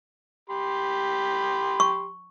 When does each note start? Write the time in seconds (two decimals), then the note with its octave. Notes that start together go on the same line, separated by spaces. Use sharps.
0.50 G4 B5 C6
1.80 C#6